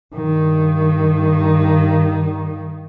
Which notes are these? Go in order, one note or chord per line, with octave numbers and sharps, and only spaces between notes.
G2 D#3